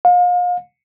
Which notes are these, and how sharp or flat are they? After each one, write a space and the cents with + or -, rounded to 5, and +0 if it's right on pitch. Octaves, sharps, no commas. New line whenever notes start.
F5 +35